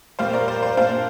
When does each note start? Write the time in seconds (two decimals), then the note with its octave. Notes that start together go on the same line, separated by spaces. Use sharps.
0.19 A#2 G3 C4 C5 F5
0.33 A#4 D5
0.48 C5
0.63 C5
0.77 A#2 A#3 D4 C5 F5